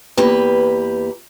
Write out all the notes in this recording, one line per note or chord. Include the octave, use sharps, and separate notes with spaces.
E2 A#3 G4 B4